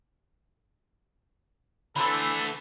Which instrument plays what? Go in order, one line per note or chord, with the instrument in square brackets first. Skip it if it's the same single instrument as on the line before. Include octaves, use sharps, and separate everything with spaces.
[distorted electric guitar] D3 A3 [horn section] E3 A4 [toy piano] B5 C6 D6